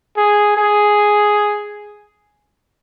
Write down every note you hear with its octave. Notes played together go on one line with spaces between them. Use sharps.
G#4
G#4